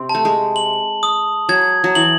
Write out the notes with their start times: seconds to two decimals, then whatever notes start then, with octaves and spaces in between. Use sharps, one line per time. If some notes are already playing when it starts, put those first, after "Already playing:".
Already playing: C3 C4
0.09 A5
0.15 A3
0.25 G#3
0.56 F#7
1.03 D#6
1.49 F#3 G#6
1.84 F#3
1.95 E3 F#7